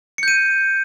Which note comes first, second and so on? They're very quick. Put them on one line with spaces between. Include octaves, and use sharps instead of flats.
C#7 G6 D#7